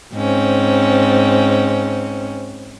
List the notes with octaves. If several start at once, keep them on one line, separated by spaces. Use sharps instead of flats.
G#2 C4 C#4